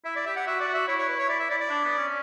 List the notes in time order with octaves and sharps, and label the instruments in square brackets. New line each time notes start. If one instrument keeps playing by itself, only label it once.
[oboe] E4 [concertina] E5
[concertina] D5
[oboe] G4 [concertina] E5
[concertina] F#5
[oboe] F#4 [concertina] E5
[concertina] D5
[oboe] F#4
[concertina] E5
[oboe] E4 [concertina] C#5
[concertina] C#5
B4
C#5
[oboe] E4 [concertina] D5
[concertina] E5
[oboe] E4 [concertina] D5
[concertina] D5
[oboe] D4
B3
C#4